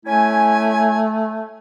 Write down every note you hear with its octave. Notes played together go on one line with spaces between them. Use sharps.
A3 C#4 E4 G#5